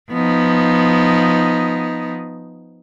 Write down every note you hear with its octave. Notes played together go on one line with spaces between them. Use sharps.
F3 B3 D#4